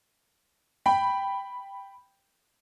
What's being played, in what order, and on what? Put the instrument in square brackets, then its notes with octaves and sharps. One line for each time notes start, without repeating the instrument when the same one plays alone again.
[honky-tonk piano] G5 B5